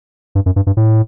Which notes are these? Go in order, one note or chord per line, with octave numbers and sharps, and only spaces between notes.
G2
F#2
G2
G2
A2